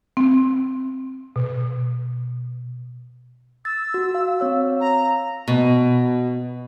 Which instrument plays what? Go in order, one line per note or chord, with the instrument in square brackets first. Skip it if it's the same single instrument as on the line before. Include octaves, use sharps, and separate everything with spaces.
[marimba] C4
B2
[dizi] E6 [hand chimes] A6
[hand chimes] F#4
F5
C4 C#5 F5
[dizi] A#5
[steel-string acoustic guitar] B2